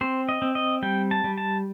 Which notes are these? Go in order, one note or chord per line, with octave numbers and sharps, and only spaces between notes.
C4 C5
D#5
C4
D#5
G3 G5
A5
G3
A5